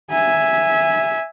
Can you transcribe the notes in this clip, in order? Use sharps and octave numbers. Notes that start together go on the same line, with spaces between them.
E5 G#5